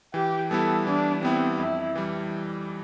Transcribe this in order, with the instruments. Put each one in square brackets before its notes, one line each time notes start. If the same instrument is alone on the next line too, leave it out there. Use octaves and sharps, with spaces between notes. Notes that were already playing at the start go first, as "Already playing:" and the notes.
[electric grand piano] E3 [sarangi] G4
[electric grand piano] G3 B3 E4 [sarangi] A4
[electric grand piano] E3 [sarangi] D4
[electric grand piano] G3 B3 E4 [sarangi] C4
[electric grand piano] F2 [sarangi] E4
[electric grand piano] E3 G3